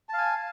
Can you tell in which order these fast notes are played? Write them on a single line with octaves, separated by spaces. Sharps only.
A5 F5 G#5